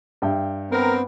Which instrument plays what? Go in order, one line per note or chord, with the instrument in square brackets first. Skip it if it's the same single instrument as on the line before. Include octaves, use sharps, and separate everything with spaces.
[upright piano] G2 E5 G5
[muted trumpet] B3 [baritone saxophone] C4 [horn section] A#4